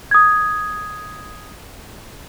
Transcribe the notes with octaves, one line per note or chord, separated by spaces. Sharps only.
D#6 G#6